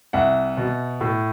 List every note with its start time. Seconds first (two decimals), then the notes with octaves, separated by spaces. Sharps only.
0.13 C2 E5 F#5
0.57 B2
1.01 A2